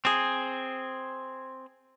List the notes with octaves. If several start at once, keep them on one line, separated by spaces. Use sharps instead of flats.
C4 G#4